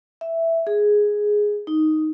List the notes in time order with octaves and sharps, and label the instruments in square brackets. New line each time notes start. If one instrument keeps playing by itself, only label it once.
[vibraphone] E5
G#4
D#4